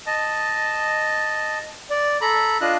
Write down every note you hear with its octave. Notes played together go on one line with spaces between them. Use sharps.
D#5 A5
D5
A4 A#5 B5
D4 F4 D#5 F#6